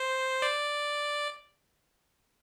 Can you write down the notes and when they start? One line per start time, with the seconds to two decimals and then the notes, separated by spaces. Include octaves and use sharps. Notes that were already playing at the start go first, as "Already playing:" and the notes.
Already playing: C5
0.42 D5